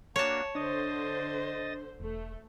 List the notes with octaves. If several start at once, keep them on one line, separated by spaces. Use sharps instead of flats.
A#3 D4 F#4 C#5 A5
D3 D4 C5 D#5 D#6 A6
E1 A3